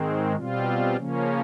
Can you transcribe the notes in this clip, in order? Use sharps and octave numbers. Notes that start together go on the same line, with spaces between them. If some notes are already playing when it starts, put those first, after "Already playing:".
Already playing: G#2 D#3 G#3 C4
B2 G3 C4 F4
C#3 F3 A#3 C#4